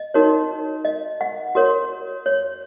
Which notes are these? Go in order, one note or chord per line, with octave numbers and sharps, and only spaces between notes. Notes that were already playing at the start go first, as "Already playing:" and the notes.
Already playing: D#5
D#4 F#4 A#4 C#5
D#5
F#5
F#4 A#4 C#5
C#5